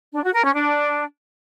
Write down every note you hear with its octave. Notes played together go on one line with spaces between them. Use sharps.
D4
F#4
A#4
C#4
D4